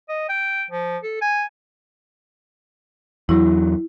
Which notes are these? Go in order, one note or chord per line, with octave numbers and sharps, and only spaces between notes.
D#5
G5
F3
A4
G#5
E2 F#3 E4